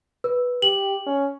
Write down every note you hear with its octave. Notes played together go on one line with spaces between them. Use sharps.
B4
G4 F#7
C#4